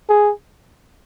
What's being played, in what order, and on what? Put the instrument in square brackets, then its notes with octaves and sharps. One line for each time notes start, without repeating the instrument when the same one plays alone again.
[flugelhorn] G#4